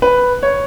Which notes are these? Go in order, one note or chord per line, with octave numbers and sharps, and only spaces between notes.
B4
C#5